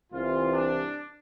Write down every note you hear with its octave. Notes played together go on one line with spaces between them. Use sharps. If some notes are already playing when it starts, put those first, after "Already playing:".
C2 C3 E3 F4
D4